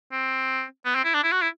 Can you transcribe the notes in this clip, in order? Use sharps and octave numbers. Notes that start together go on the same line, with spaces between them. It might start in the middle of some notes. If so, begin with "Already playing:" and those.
C4
B3
C4
E4
D4
E4
F#4
E4